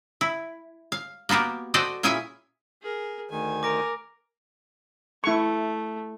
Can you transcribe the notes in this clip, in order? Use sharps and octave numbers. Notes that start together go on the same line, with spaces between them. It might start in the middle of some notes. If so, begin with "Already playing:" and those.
E4
F5
A#3 B3 F#4 G4 A#4
F#4 A4 C5 D5 D#5 G5
A#2 C#4 E4 G#4 E5 G#5
G#4 A#4
D2 D#3 G#5
A#4 D6 A#6 D7
A3 E4 C#6